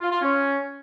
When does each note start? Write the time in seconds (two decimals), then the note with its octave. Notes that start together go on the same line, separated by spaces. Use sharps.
0.01 F4
0.11 F4
0.22 C#4